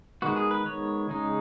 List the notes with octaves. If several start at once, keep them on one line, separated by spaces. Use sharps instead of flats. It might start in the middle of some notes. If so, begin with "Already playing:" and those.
D#3 G#3 B3 F#4
G#4
B4
C#5
C#3 G#3 D#4